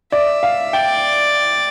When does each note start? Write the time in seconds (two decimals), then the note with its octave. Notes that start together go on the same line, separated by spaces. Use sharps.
0.12 D5 E5
0.43 F5
0.73 D5 G5